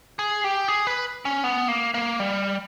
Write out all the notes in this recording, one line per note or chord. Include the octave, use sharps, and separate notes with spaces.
G#4
G4
G#4
B4
C#4
B3
A#3
A#3
G3